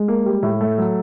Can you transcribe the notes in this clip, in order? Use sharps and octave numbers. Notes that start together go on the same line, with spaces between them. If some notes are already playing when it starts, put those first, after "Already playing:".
Already playing: G#3
A#3
G3
A2
A3
F#3